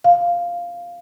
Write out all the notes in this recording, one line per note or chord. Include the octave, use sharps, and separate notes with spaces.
F5